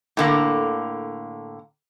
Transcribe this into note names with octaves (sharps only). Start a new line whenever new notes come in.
A2 D3 A#3